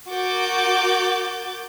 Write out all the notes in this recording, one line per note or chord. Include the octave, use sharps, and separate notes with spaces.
F#4 A#4 D6 G6 A6